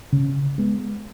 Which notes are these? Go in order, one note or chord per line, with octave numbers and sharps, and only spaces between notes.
C#3
G#3 B3